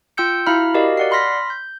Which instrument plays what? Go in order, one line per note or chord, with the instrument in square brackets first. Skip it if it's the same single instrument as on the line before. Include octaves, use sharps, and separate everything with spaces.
[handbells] F4 G5 E6 G6 C#7
E4 F#4 F5 A#5 B5 F6
F#4 G4 A#4 D5 D#5 F5
D5 F#5 C7
B5 C6 F6 A#6 B6
G6